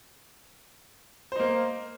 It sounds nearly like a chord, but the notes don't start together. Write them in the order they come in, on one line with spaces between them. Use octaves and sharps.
C5 D#4 A#3